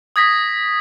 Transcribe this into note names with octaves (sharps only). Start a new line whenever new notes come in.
D#6 G#6 A#6 B6